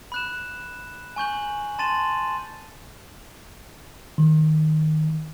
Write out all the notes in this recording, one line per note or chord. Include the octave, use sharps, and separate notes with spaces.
B5 F#6 E7
G#5 C#6 G6 F#7
A5 C6 A6 D#7 E7 F#7
D#3